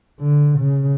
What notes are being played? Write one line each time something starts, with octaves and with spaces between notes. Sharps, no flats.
D3
C#3